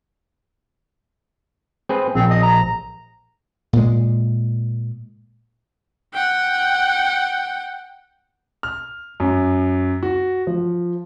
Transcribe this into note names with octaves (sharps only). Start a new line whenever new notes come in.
C4 G#4 B4
A#1 C4
D#5
A#5
A#2 G#3
F#5 G5
F6
F#2
F#4
F3